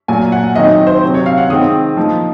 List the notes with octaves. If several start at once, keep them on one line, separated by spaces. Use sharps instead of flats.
A#2 F#3 A#3 G#5
F#5
D#3 F#3 C4 D#5
C5
C3 F#3 C4
C#5
F5
F#5
D#3 G#3 C4 D#6
F3 A#3 D#4